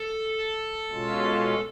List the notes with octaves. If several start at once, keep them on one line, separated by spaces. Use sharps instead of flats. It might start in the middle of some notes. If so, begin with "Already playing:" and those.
Already playing: A4
B2 G#3 C#4 F4